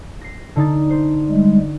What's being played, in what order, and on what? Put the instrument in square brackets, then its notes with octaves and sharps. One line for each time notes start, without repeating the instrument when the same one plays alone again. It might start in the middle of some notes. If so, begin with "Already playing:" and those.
[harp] A#6 C7
D3 D#4 A6
C5
[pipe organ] G3 G#3